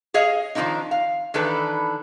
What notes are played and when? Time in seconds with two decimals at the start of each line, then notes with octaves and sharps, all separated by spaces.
0.14 G#4 C#5 D#5 F5
0.55 D#3 F3 G#3 A3 D4 D#4
0.91 F5
1.34 D#3 E3 D4 A4 B4